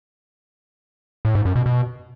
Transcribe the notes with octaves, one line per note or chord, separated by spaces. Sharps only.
A2
G#2
F#2
B2
B2